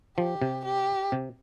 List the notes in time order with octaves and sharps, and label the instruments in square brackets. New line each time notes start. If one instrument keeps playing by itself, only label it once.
[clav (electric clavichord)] F3 [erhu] G4
[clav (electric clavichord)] C3
[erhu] G4
[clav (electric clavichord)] C3